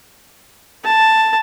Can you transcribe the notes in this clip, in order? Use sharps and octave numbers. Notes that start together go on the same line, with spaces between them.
A5